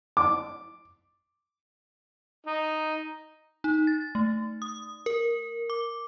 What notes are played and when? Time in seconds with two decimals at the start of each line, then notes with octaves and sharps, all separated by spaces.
0.17 D6
2.47 D#4
3.64 D#4
3.87 A6
4.15 A3
4.62 D#6
5.06 A#4
5.70 D6